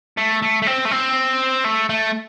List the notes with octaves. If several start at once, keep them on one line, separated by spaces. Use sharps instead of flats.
A3
A3
A3
C4
A3
C4
A3
A3